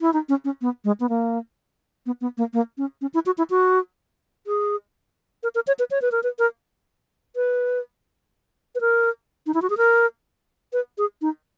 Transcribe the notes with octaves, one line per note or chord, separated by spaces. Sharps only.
E4
D#4
C#4
C#4
B3
G#3
B3
A#3
B3
B3
A#3
A#3
C#4
C#4
E4
F#4
E4
F#4
G#4
A#4
A#4
C#5
B4
C#5
B4
A#4
B4
A#4
B4
B4
A#4
D#4
E4
F#4
G#4
A#4
B4
G#4
D#4